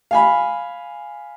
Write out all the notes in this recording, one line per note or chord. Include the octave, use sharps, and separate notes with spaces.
F5 G#5 B5